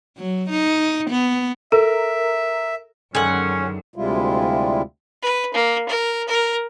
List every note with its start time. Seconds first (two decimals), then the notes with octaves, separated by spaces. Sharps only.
0.18 F#3
0.50 D#4
1.10 B3
1.72 A4 A#4 E5
3.15 F#2 D3 D#3 G#3 C#4 F#5 G#5
3.96 D2 C3 G3 G#3 E4 F4
5.23 B4
5.54 A#3
5.89 A#4
6.28 A#4